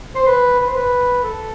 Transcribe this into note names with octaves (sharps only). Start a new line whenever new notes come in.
C5
B4
B4
C5
B4
A4